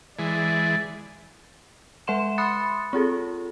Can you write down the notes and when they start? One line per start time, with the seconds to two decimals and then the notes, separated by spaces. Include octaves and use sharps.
0.19 E3 G#3 D5
2.07 G#3 B4 E5 F#5 C6 E7
2.38 B5 C6 D#6 F#6 A6 C#7
2.93 C4 F4 G#4 A4